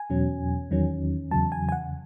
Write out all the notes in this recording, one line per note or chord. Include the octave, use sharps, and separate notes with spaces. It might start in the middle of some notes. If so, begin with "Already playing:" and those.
Already playing: G#5
E2 B2 F#3 C#4
E2 D#3 F#3 C#4
E2 C#3 F#3 A5
G#5
G#5
F#5